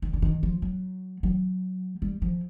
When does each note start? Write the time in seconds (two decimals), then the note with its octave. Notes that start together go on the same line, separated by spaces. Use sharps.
0.02 D#3
0.13 D3
0.22 D#3
0.43 F3
0.62 F#3
1.23 F#3
2.02 G3
2.22 F3